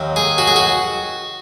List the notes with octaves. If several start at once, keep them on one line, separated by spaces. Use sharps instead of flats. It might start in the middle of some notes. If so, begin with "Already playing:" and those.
Already playing: D#2 D#3 F#3
G#4
F#4
G#4
F#4